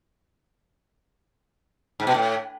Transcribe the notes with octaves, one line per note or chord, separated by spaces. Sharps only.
G#2
B2
A2